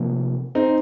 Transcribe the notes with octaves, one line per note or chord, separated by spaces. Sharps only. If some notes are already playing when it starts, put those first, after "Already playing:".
Already playing: C3 F3 A#3
C4 D#4